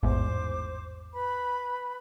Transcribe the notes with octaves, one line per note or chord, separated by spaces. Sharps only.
A1 E2 G#2 C5 D6
B4 B5